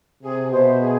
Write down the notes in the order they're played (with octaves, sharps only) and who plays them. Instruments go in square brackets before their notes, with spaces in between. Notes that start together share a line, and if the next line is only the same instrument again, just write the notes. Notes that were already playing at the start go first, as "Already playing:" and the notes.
[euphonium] C3 [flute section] G#4
[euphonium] B2 [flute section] C5 E5
[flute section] G#4